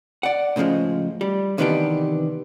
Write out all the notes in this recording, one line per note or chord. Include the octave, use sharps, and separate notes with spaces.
D5 F#5
A2 C#3 E3 F3 G#3
G3
C3 D#3 E3 B3 D4 G4